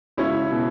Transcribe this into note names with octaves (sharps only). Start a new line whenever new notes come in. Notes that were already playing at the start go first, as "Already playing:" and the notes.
C#2 C#4 E4
B2